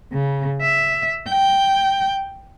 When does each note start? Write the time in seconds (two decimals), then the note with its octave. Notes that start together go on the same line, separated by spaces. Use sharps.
0.12 C#3
0.62 E5
1.30 G5